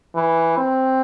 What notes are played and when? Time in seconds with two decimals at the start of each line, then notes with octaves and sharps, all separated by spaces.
0.15 E3
0.57 C4